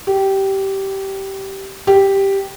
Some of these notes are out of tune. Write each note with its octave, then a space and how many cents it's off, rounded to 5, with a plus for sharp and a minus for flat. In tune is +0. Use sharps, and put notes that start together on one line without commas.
G4 -15
G4 +0